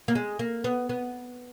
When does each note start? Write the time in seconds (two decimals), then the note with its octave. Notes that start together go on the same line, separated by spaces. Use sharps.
0.08 A#3
0.15 G#3
0.39 A#3
0.64 B3
0.89 B3